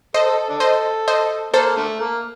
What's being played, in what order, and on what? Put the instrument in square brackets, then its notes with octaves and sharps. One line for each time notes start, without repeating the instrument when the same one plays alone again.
[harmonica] A4 [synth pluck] C5 D#5
[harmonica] A4
A4
D4 A4
[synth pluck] C5 D#5
C5 D#5
[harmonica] A#3 [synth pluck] A4 C5
[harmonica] D3 A3
A#3